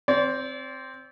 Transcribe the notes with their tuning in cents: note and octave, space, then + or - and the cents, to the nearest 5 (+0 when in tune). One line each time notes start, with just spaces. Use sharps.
C4 +0 D5 -40